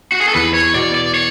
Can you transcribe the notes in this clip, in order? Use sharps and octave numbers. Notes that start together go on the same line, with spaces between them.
F#4
G#4
A4
E2 B4
C#5
B2 D5
D5
C#5